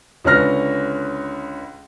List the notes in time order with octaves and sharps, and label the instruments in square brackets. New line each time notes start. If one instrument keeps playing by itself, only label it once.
[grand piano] C#2 D3 C#4 B4 F6 A#6